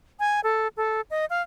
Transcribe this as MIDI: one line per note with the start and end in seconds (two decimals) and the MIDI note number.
0.20 0.40 80
0.44 0.68 69
0.77 1.01 69
1.11 1.25 75
1.30 1.42 77